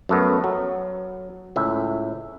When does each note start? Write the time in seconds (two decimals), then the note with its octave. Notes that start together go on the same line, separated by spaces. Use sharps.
0.09 F#2 A3 B3
0.44 F#3
1.56 C#2 A2 E5